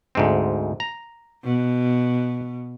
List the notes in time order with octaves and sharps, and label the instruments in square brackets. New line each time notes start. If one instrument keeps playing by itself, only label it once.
[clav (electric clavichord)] D2 G#2 C4
A#5
[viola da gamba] B2